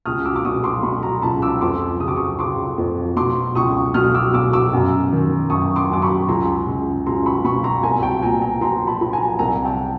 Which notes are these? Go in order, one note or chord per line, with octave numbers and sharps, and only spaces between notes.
C#2 D#6 F6
D6 E6
D6
B2 C#6 D#6
C6 D6
B2 B5 C#6
A#5 C6
C#2 A5 B5
D6 E6
F2 C6 D6
C#3 D#6
D6
C#6 D#6
C#3 C6 D6
F2
B2 C6 D6
C#2 C#6 D#6
B2 D#6 F6
D6 E6
B2 D6 E6
D6 E6
F#2
D#3
F#2 C#6 D#6
C6 D6
F#2 D6
B5 C#6
C#2 A#5 C6
C#2
C#2 A#5 C6
B5 C#6
B2 B5 C#6
A#5 C6
C2 G#5 A#5
G5 A5
A#2 G#5 A#5
G#5 A#5
F3 A#5 C6
A5 B5
F3 B5
G#5 A#5
C2 G#5 A#5
G5 A5